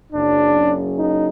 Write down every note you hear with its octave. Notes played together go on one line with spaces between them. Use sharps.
F#1 F#2 C#3 D4
D#4